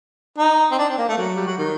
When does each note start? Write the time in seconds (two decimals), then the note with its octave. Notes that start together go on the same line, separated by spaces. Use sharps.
0.38 D#4
0.71 C4
0.79 D4
0.89 C4
0.98 A#3
1.09 A3
1.18 F#3
1.36 G3
1.47 F#3
1.58 D#3